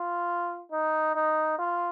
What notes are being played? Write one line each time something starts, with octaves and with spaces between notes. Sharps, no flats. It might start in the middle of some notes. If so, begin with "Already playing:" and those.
Already playing: F4
D#4
D#4
F4